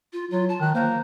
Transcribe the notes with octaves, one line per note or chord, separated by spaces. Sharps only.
F4
F#3 F4
A5
D#3 F#6
A#3 C5